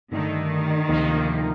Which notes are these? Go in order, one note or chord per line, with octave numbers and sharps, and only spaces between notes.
G2 D3 D#3 A3 D#4
D2 C3 F3 A#3 D#4